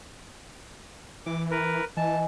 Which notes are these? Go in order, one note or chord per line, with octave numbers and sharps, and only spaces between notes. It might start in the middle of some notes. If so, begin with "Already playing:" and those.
E3 D6
A#4 B4
E3 D#5 G#5 A5